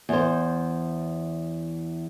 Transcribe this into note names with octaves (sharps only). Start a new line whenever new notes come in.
E2 C5